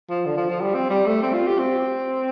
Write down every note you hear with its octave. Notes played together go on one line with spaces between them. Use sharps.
F3
D3
F3
F3
G3
C4
G3
A3
C4
F4
G4
C4